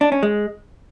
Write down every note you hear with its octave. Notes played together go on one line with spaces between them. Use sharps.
D4
C#4
G#3